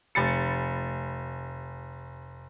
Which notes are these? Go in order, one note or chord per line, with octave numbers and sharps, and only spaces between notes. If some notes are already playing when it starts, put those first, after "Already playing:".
F1 B5 A6 C#7